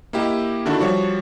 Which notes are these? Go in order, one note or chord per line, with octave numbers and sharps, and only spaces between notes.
A#3 E4 G4 D#5
D3 D#3 D4 E4 F#4
F3 G3 F#4 C#5